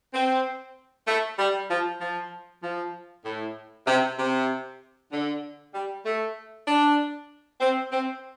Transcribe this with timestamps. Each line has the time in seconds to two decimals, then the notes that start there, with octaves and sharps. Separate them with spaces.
0.14 C4
1.07 A3
1.39 G3
1.70 F3
2.01 F3
2.63 F3
3.26 A2
3.87 C3
4.19 C3
5.12 D3
5.74 G3
6.05 A3
6.68 D4
7.60 C4
7.92 C4